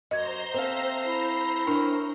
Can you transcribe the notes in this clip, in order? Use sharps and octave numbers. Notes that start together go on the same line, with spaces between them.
F#2 C5 D#5 A#5 C6 G#6
C4 A4 E5 F5
E4
C#4 D4 A#4